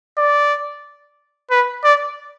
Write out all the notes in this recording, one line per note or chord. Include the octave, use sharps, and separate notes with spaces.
D5
B4
D5